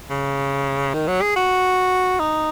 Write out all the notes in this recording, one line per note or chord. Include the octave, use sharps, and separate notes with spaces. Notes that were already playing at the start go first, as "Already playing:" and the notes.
C#3
D#3
F#3
G#4
F#4
D#4